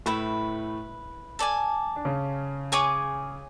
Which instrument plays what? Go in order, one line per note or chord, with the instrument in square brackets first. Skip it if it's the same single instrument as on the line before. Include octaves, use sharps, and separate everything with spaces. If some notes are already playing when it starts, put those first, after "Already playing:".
[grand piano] A2 A3 [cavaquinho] E4 B4 E5
[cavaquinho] A4 D5 G#5
[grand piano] D4
C#3 C#4
[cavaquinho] G#4 C#5 G#5 D6